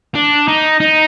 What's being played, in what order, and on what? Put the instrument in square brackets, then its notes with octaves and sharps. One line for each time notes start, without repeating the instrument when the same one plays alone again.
[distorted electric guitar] D4
D#4
D#4